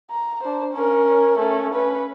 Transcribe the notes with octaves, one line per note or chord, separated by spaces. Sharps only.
A#5
D4 C5
C#4 A#4
A3 C#4
C#4 B4